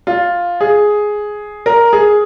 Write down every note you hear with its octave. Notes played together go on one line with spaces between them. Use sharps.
F4
G#4
A#4
G#4